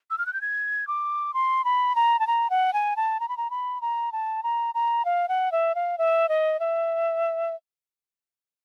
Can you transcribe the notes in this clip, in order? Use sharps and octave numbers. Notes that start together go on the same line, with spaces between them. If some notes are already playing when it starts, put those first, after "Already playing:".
E6
F6
F#6
G6
G#6
D6
C6
B5
A#5
A5
A#5
F#5
G#5
A5
A#5
B5
A#5
B5
A#5
A5
A#5
A#5
F5
F#5
E5
F5
E5
D#5
E5